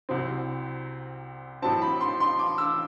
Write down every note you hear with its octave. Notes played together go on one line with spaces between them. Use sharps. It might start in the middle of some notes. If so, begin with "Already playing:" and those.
C2 C3 F#3 C4
A1 A2 F#3 C4 A5
B5
C6
C6
D6
E6